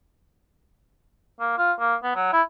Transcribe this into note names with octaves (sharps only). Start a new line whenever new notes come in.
A#3
F4
A#3
B3
F#3
E4